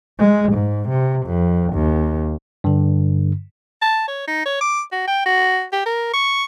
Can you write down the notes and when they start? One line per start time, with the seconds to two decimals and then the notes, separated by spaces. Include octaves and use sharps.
0.19 G#3
0.53 G#2
0.89 C3
1.26 F2
1.73 D#2
2.64 G2 D3
3.82 A5
4.08 C#5
4.27 D#4
4.46 C#5
4.61 D6
4.92 F#4
5.08 G5
5.26 F#4
5.73 G4
5.86 A#4
6.14 C#6